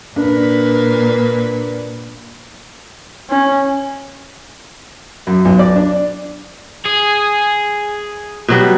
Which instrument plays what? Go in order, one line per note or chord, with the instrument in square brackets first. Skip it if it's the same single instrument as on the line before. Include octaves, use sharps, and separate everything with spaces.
[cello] A#2 [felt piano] D4 [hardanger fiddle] A#4 B4
[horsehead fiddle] C#4
[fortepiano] F#2
B1
D5
D4
[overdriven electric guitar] G#4
[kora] B2 F#3 G3